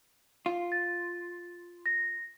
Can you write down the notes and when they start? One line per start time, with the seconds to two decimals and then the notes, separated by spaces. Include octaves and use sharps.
0.46 F4
0.72 A6
1.86 A#6